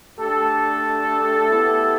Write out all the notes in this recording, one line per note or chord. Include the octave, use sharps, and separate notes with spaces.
A3 D4 G4 A4
B3 E4 G4